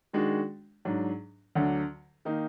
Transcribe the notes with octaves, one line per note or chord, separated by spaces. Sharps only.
D#3 G#3 D4 F#4
G#2 F#3 D4
D2 D3 F#3
D#3 A#3 D#4